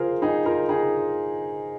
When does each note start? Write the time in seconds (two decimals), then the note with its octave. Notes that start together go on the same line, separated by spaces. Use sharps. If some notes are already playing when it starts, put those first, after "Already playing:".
Already playing: F4 G#4 A#4 C5
0.22 D#4 G#4
0.46 F4 A#4
0.69 D#4 G#4